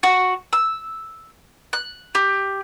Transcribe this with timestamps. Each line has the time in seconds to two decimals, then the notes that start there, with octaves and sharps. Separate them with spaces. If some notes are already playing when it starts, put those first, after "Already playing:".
0.03 F#4
0.53 E6
1.73 F#6
2.15 G4